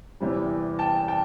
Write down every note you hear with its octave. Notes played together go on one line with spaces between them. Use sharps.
E2 C3 E3 G3
G5 A5
G5 A5